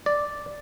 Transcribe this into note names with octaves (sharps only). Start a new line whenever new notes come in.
D5